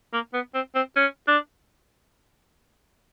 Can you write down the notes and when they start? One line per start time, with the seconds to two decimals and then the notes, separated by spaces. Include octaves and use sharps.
0.13 A#3
0.34 B3
0.55 C4
0.75 C4
0.96 C#4
1.28 D4